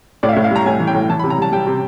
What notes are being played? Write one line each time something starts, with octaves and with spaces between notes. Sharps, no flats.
A2 D5
F5
E5
A2
F5
G3 A#5
A2 G#5
E3
G5
A2
E3 A5
B5
C3
A#5
G3 A5
G3 G5
C3